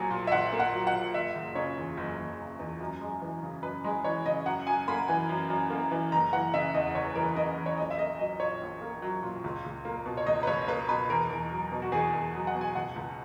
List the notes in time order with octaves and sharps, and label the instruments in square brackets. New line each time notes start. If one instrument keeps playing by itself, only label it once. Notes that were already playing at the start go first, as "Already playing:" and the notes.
Already playing: [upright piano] A#1 F#3 A#3 G#5
A#2
E5
A#1 F#5
A#3
F#5
F#3
F#5
A#2
F#1 E5
F#1
C#3 C#5
E2
F#1
F#1
C#3
E2
F#2
G#3
E3
C#3
F#2 B4
G#3
E3 C#5
C#3 D#5
F#2 F#5
F#2 G#5
A#3 B5
E3 G#5
F#2
F#2
A#3
E3
F#1 A#5
E3 F#5
C#3 E5
E2 D#5
F#1 C#5
B4
E3 A#4
B4
C#3 D#5
E2
C#5
A#1 D#5
E5
A#3 D#5
F#3 D#5
A#2 C#5
A#1
A#3
F#3
A#2
C#2
C#2
A#3
B2
C#5
C#2 D#5
B4
C#2 C#5
A#3 B4
B2 B4
E2 A#4
E2
F#3
B2
F#4
E2 G#4
E2
F#3
F#5
B2
G#5
C#2 F#5
C#2